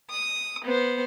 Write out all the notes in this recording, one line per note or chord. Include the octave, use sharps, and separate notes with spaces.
D#6
B3 C5